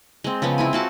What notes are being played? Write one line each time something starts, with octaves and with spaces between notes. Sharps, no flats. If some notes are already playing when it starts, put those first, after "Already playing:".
G#3 C4
C#3 F3 B3 C4
C4 E4 G#5
F4 F#4 A5